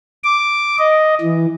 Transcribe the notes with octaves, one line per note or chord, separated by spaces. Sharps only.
D6
D#5
E3